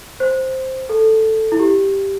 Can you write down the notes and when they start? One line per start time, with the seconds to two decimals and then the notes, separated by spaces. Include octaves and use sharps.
0.20 C5
0.89 A4
1.52 E4
1.59 G4